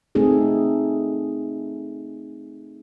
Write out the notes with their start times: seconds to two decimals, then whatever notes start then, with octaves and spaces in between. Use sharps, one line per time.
0.15 A3 C4 D#4 G#4 A4